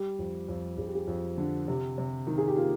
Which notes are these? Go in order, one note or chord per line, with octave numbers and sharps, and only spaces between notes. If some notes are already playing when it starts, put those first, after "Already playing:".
Already playing: G3 G4
F2
F2
F2 G#4
G4
G#4
F2
D3
C3 G4
C3
D#3
G#4
G4
A#3 F4